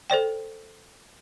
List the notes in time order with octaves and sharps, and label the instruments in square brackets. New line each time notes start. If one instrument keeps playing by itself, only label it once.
[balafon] A4 C5 D5 G5